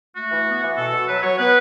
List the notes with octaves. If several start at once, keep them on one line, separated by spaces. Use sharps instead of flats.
A3 F#4
E3
B3
E3
B2 A4
B2
F#3 B4
F#3 C#5
B3 B4